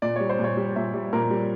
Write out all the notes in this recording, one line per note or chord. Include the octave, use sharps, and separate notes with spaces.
A#2 D5
G3 C#5
C5
A#2
C#5
G3
A#2 E5
G3
A#2 A#4
G3